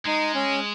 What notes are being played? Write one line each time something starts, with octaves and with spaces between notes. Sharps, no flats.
G#3 D#4
C#4